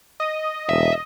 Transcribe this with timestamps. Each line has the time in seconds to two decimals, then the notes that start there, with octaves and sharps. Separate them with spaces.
0.20 D#5
0.69 E1 E5